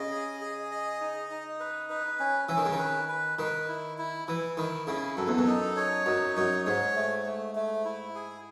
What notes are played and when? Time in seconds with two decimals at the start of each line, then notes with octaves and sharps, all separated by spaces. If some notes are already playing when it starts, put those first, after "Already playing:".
Already playing: C#3 D#5
0.11 G#4
0.41 G#4
0.71 D#5
1.01 D#4
1.30 D#4
1.60 B4
1.90 B4
2.19 C#4
2.49 E3 C#4
2.57 D#3
2.65 C#3
2.72 D#3
2.79 B4
3.09 B4
3.39 D#3 B4
3.68 E4
3.98 E4
4.28 E3 E4
4.57 D#3 E4
4.87 C#3 E4
5.17 F#2 A4
5.28 E2
5.38 F#2
5.47 D#4
5.76 C#5
6.06 F#2 D#4
6.36 F#2 C#5
6.66 G#2 C#5
6.96 A3
7.26 A3
7.55 A3
7.85 E4
8.15 G#4